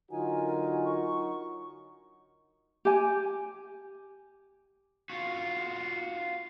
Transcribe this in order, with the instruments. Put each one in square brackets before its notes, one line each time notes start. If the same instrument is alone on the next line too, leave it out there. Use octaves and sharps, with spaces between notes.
[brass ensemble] D3 F#4 A#4 [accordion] F#3 D#4 [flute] F4 [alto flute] G#5
[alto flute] C#6
[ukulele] G4 G#5
[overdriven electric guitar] F4 F#4